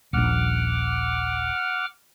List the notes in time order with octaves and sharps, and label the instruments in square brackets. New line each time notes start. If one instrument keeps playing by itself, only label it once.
[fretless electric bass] D#1 A#1 [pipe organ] F#5 D6 F6